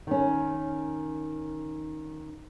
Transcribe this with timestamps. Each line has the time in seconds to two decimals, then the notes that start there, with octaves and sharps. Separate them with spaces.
0.07 D#3 C#4